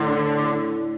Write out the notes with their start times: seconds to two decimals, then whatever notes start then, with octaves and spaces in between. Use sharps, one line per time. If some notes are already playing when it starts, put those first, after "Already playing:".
Already playing: A2 D3